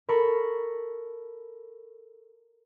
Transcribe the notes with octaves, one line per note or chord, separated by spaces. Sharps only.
A4 A#4 B5 C#6